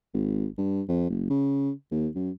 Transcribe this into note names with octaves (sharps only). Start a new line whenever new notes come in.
G#1
G2
F2
F#1
C#3
D#2
F#2